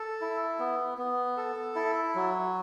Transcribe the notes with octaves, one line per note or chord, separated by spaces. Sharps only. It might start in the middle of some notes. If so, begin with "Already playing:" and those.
Already playing: A4
E4
B3
B3
A4
E4
F#3